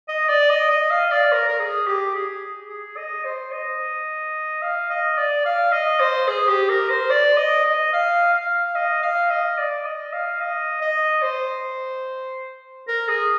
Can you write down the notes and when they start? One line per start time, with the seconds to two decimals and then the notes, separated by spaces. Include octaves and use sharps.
0.09 D#5
0.29 D5
0.50 D#5
0.70 D#5
0.91 F5
1.11 D5
1.32 A#4
1.49 A#4
1.60 G#4
1.87 G4
2.15 G#4
2.69 G#4
2.97 D#5
3.25 C5
3.52 D#5
4.62 F5
4.90 D#5
5.17 D5
5.45 F5
5.72 D#5
6.00 C5
6.28 G#4
6.48 G4
6.69 A#4
6.90 C5
7.10 D5
7.37 D#5
7.65 D#5
7.93 F5
8.34 F5
8.76 D#5
9.03 F5
9.30 D#5
9.58 D5
9.85 D#5
10.13 F5
10.41 D#5
10.81 D#5
11.22 C5
12.88 A#4
13.08 G#4